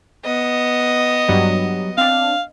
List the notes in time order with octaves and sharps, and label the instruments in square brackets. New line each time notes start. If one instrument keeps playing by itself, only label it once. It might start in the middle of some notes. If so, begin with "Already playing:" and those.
[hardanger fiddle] B3 D#5
[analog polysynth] G2 F#3 G3
[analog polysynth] C4 D4 [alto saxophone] F5